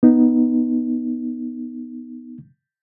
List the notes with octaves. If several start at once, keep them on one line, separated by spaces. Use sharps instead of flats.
B3 D#4